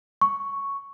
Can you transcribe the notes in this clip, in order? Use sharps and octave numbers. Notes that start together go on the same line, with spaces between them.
C#6